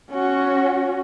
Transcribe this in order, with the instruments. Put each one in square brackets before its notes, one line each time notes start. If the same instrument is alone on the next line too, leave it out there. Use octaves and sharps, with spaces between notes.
[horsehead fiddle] C#4 F#4